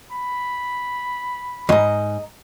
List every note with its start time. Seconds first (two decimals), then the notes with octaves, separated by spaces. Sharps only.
0.12 B5
1.69 E2 G#2 D#5 A#5